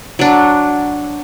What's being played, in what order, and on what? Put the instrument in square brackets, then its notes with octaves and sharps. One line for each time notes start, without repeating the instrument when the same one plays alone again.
[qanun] F#3 D4